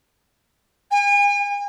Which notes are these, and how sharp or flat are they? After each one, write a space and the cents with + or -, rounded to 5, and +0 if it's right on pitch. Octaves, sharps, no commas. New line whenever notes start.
G#5 -40